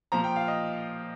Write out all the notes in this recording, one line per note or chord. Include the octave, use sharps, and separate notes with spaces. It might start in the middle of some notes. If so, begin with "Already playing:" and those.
A#2 F3 A#5
G5
F5
D#5